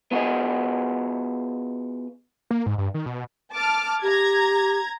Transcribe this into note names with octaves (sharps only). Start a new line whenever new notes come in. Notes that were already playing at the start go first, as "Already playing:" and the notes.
B3 F4 F#4 G#4 D#5
A#3
G#2
G2
D#3
B2
A5 D6 F6
G4 A#5 G#6